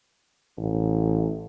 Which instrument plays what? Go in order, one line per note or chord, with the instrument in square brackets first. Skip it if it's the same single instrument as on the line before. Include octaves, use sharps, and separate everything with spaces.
[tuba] A1